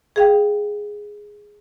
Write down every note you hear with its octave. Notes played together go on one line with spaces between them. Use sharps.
G#4 F5 G5